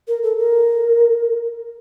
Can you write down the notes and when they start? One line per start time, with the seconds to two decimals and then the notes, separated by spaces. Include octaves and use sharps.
0.08 A#4
0.23 A4
0.38 A#4